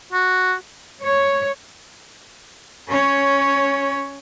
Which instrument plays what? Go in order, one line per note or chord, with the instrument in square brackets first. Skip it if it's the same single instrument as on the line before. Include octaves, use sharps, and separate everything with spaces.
[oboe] F#4
[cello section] C#5
[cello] C#4 C#5